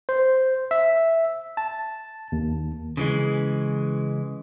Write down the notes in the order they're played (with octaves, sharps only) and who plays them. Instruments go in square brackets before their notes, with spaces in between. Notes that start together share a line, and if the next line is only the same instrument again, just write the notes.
[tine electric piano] C5
E5
A5
D#2
[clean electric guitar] C#3 E3 G#3